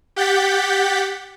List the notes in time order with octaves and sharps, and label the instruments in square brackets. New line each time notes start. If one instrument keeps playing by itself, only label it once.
[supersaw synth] G4 F#5 G6 A6 B6